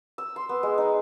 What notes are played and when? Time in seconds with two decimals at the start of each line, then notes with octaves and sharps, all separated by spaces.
0.18 E6
0.36 C6
0.49 B3
0.63 G#3
0.78 D#4